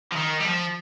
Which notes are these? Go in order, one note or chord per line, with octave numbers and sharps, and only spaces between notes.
F3
D#3
G3
F3